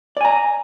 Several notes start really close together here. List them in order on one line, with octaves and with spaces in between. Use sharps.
D5 G#5 A#5